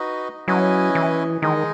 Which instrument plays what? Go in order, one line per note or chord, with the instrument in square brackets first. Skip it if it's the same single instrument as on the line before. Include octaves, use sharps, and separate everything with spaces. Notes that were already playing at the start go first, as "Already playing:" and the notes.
Already playing: [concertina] D#4 F#4 B4 D#5
[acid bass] F#3 [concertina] C#4 E4 B4 D#5 G#5
[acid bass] E3
[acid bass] D#3 [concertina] G#3 D#4 G#4 D#5